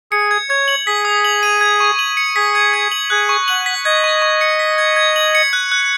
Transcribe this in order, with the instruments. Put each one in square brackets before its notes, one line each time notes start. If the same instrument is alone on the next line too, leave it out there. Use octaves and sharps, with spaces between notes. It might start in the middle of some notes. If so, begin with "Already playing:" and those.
[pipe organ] G#4 [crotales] C#7
[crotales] G#6
[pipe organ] C#5 [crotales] G#6
[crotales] F#7
[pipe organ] G#4 [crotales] B6
[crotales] D#6
F#7
D#7
G#6
C#6
F#7
C#7
[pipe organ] G#4 [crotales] B6
[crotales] G#6
G#6
F#7
[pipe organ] G#4 [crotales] F#6
[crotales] C#6
[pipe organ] F#5 [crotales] F#7
[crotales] B6
[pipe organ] D#5 [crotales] G#6
[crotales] C#6
C#6
C#7
B6
G#6
G#6
F#7
C#7
F#6
F#6